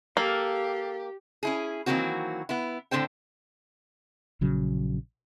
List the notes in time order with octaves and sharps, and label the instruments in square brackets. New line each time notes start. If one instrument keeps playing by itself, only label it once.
[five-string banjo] A#3 [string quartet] G4 [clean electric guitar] A4 F5
[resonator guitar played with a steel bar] C#4 E4 G#4
D#3 E3 F#3 A#3 C4 F#4
B3 E4
A2 D3 C4 C5 G5
[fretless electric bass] A#1 C#3 F#3